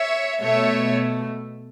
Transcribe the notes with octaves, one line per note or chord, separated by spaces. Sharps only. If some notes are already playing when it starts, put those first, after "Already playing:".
Already playing: C#5 E5
B2 A3 C#5 E5